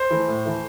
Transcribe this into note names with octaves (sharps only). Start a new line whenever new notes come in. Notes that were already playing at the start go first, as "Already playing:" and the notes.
Already playing: C5
E3 A3
A2
E3 A3